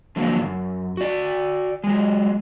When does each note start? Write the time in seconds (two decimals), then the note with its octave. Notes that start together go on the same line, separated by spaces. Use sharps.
0.16 D3 F3 F#3 A#3
0.41 F#2
0.97 F#4 D5
1.84 F#3 G#3